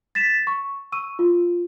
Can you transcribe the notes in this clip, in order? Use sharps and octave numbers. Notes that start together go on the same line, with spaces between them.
A6 B6 E7
C#6
C#6 E6 D#7
F4